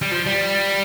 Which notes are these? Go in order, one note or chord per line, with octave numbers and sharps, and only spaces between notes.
G3
F3
G3